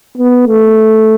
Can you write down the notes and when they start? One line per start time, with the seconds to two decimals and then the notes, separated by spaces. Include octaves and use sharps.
0.17 B3
0.47 A3